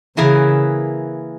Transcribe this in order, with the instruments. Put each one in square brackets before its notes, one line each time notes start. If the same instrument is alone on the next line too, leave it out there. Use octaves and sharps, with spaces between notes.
[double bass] C#3 [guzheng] E3 A#3 E4 G#4 B4